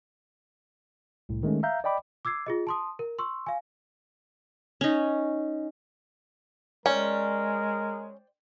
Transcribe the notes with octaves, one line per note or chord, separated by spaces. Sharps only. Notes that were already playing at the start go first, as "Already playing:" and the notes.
C2 A2
D#3 G#3 A3 C#4
E5 F5 A#5 G6
D5 D#5 G5 B5 D6
D6 E6 G#6 C7
F4 G#4 D#5
A5 C6 D#6
A#4
C6 C#6 E6
F5 G#5
C#4 D#4
G#3 C#4 A#4 C5 D5 G5